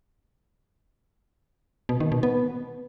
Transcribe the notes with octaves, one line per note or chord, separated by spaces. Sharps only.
B2
D#3
B2
B3